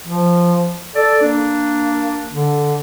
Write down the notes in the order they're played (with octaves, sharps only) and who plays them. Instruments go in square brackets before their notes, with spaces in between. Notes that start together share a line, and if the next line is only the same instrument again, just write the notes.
[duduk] F3
[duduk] A4 [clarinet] D5
[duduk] A#3 [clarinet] D4
[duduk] D3